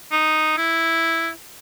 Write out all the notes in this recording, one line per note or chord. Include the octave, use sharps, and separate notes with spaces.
D#4
E4